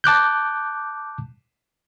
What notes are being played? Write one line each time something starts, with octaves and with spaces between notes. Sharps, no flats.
A5 D6 F#6 G6